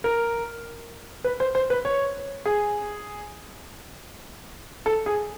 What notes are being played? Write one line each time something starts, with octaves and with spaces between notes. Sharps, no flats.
A#4
B4
C5
C5
B4
C#5
G#4
A4
G#4